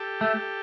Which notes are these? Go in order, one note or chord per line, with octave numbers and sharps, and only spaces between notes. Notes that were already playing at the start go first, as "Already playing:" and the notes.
Already playing: G4 A4
A3